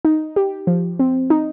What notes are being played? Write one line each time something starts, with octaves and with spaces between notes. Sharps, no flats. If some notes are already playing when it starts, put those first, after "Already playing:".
D#4
G4
F3
C4
D#4